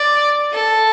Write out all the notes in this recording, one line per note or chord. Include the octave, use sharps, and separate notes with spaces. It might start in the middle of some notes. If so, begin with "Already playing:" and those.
Already playing: D5
A4